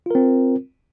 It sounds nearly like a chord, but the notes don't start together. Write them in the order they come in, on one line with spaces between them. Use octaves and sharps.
F4 A#4 C4